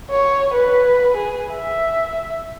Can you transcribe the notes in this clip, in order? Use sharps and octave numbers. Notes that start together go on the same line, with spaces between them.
C#5
B4
G#4
E5